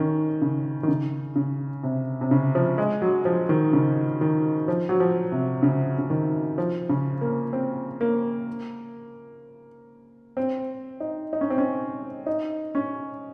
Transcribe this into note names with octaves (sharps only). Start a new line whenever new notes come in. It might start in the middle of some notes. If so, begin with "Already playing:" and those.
Already playing: D#3 C#4
C#3
D#3
C#3
C#3
C3
C3
C#3
F3
G#3
F#3
F3
D#3
C#3
D#3
F3
F#3
F3
C3
C#3
C#3
D#3
F3
C#3
A#3
C4
A#3
C4
D#4
D#4
C#4
C4
C#4
D#4
C#4